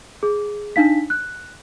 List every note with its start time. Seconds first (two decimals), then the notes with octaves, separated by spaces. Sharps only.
0.23 G#4
0.76 D4 D#4 F5 B6
1.10 F#6